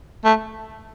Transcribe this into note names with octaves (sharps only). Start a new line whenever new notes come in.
A3